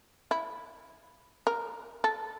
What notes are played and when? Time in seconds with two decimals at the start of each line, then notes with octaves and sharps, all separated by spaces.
0.31 E4
1.47 A#4
2.04 A4